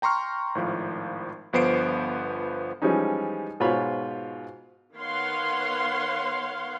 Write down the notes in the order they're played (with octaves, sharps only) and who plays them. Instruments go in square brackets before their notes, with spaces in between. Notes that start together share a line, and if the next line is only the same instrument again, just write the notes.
[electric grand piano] G5 A#5 C6 C#6 F6
G#1 A2 F3
G1 F3 B3 C5 C7 D7
[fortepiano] E3 F3 G3 G#3 C#4 D#4
G#2 B2 F4 C5 C#5 B5
[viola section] D#3 B3 C#5 F5 F#5 C6